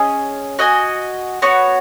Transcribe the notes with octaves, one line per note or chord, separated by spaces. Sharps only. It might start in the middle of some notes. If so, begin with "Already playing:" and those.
Already playing: C#4 G#4 D#5
F#4 D#5 G#5
B3 F#4 C#5